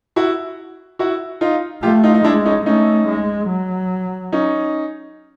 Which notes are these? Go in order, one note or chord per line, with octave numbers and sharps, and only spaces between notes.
E4 F#4
E4 F#4
D#4 F4
A3 F4 G4
D#4 F4
D#4
G#3 D4 E4
C#4 D#4
A3 C#4 D#4
G#3
F#3
C#4 D#4